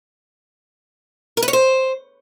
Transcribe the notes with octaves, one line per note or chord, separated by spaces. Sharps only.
A#4
B4
C#5
C5